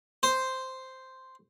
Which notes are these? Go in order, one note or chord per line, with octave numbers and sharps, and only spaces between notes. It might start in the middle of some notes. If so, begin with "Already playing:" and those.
C5